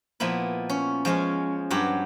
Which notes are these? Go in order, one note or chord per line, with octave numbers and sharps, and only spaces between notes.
A#2 F3 B3 E4
C#4
F3 G#3 C#4
G2 F#3 G4